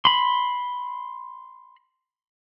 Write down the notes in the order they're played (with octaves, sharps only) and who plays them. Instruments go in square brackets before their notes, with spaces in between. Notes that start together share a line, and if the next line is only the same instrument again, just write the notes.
[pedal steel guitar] B5 C6